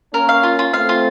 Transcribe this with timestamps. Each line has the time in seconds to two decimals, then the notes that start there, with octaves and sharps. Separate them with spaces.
0.13 A#3 C#4 A#4
0.29 F5
0.43 F4
0.59 F4
0.73 A3 C4 F5
0.89 F4